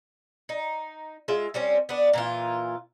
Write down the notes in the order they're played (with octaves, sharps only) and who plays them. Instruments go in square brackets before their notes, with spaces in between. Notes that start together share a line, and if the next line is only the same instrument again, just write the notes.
[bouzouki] D#4
G#3 F4 E5
G3 C4 C#4
B3 D4
A#2 E3 F4